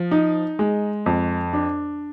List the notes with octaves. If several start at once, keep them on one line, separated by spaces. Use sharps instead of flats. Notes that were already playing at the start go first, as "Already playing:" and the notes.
Already playing: F3
D#4
G#3
F2
D4